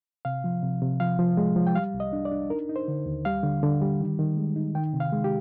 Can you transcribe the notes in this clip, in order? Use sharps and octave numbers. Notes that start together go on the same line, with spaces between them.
C3 F5
F3
C3
C3
F3 F5
F3
G#3
F3
G5
G3 F5
C2
D#5
D4
D5
D4
D#4 A#4
D#4
C5
D3
D#2
G3 F5
D3
D3
G3
D#3
D#3
G#3
D#4
D#3 G5
C3
F5
G#3
G4